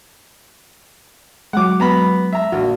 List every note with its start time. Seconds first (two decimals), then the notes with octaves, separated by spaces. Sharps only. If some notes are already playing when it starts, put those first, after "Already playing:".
1.53 F#3 G#3 F#5 D6
1.80 B3 A#5 B5
2.33 E5 A#5
2.52 A#1 F#4